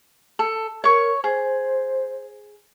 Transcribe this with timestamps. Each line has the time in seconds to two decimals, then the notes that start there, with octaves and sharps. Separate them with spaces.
0.39 A4
0.84 A#4 C#5 C#6
1.24 G#4 C5